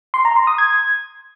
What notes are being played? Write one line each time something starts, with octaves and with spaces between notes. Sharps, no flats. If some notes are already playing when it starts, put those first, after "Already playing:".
C6
A#5
C6
D#6
G#6